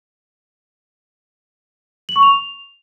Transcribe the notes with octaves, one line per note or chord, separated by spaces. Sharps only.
F#7
C#6
F7